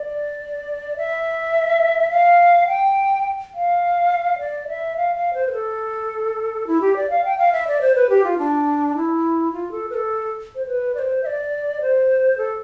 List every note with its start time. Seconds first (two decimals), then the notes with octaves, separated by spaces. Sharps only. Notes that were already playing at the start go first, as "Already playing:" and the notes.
Already playing: D5
0.97 E5
2.11 F5
2.68 G5
3.54 F5
4.39 D5
4.68 E5
4.97 F5
5.15 F5
5.34 C5
5.47 B4
5.53 A4
6.67 E4
6.81 G4
6.97 D5
7.10 F5
7.25 G5
7.38 F5
7.53 E5
7.67 D5
7.81 C5
7.95 B4
8.10 G4
8.24 F4
8.39 D4
8.96 E4
9.52 F4
9.71 A4
9.90 B4
9.94 A4
10.55 C5
10.67 B4
10.95 D5
10.99 C5
11.23 E5
11.27 D5
11.81 C5
12.38 A4